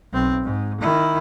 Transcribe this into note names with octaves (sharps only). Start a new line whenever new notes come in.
B1 C4
G#2
D#3 E4